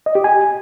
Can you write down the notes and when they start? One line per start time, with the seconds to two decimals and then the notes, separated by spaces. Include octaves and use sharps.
0.06 D#5
0.15 G4
0.24 G#5